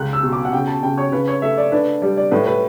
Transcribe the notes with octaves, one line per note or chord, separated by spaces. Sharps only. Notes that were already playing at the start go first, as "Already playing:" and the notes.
Already playing: C#2 C#3 F#6
E6
B2
D6
F#5
C#3 G5
A5
C#3 G5
C#5
C#3 B4
C#5
A3 E5
D5
D4 B4
G3 D5
D5
A2 B4
B4